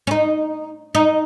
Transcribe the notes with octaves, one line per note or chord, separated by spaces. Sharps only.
C#4
D#4
D#4